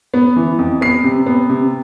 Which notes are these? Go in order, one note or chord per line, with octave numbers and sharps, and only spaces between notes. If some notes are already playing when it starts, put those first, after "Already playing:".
B3
E3
F2
B3 C7
C3
B3
C3